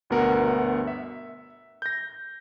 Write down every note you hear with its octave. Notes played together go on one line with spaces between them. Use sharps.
G1 D2 B2 B3 A#4 F#5
E5
G6 A#6